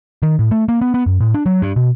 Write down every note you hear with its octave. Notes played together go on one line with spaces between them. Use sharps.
D#3
A2
A3
A#3
B3
B3
F#2
A2
D4
F#3
G2
B2